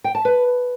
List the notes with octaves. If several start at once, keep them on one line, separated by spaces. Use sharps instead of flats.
G5
A5
B4